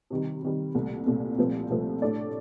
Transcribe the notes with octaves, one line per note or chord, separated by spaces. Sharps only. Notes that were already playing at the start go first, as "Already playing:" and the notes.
C3 D#3 G3
C3 D#3 G3
C2 A#2 A3
C2 A#2 A3
C2 A#2 F3 A3 C4
C2 A#2 F3 A3 C4
A2 A3 D4 A4 D5